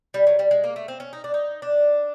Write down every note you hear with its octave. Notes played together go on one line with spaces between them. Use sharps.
G3
F#3
G3
G#3
A#3
A3
C4
C#4
D#4
D4
D#4
D4